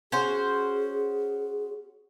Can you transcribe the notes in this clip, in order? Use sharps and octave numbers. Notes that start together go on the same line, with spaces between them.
C#4 F#4 G#4 C5